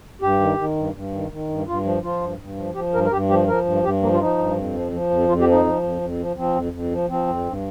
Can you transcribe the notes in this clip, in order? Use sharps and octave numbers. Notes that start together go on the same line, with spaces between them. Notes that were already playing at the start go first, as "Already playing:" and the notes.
G2 G4
D#3
D#3
G2
G2
D#3
D#3
G2
G2 F4
F3
F3 F4
G2
G2
F3
F3 G4
G2 A#4
A#4
G2 G4
F3 G4
F3 A#4
G2
G2 G4
F3 A#3
F4
F3 D#4
G2
F2
F3
F3
F2
F2 F4
G4
F3
D#4
F3
F2
F2
F3
F3 C4
F2
F2
F3
F3 C4
F2
G2